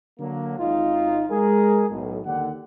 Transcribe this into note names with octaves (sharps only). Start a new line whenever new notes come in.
D3 F#3 A#3
G#1 D#4 F4
G#3 G#4 A#4
B1 A2
D#2 D3 G4 F#5